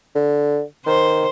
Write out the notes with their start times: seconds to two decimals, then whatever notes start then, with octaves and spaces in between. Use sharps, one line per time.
0.15 D3
0.86 D#3 C5